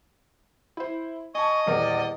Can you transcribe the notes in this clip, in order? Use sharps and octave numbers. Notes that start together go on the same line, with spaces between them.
E4 C5
D#5 G#5 A5 C#6
D#1 E2 A#4 D5